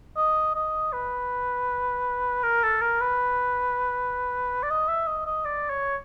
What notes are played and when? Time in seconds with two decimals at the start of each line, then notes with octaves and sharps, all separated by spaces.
0.17 D#5
0.55 D#5
0.93 B4
2.43 A#4
2.63 A4
2.81 A#4
3.01 B4
4.63 D5
4.70 D#5
4.89 E5
5.07 D#5
5.26 D#5
5.45 D5
5.70 C#5